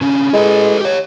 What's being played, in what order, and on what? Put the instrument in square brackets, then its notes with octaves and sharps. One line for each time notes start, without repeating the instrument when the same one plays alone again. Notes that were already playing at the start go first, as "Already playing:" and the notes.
[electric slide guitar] D3 C#4
[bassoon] G#3 [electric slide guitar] E4 A4 B4
[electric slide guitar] G4 C#5